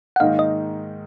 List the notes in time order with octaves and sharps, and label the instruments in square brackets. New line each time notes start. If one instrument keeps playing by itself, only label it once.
[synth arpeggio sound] F#5
[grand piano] G#2 D#3 A#3 D#4 A#4 [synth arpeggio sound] F5
[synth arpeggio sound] D#5